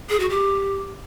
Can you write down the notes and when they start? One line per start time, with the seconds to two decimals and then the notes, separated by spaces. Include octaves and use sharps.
0.10 G#4
0.20 F#4
0.30 G4